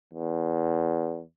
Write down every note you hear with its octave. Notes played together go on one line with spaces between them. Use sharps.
E2